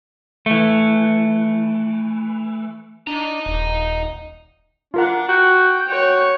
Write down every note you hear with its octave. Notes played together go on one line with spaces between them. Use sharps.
E3 A3
D4 D#5 A#5
D#1
D4 F4 A#4 F#5
F#4 G5
F#4 C#5